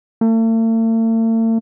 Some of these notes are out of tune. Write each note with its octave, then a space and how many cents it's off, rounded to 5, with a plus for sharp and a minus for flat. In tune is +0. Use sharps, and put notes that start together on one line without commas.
A3 +45